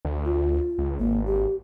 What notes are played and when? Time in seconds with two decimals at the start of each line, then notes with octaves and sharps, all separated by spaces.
0.05 D2
0.25 F4
0.78 C#2
0.99 G#1 A#3
1.26 G4